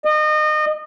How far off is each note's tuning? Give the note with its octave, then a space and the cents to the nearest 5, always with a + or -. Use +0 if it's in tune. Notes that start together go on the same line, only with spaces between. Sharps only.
D#5 -30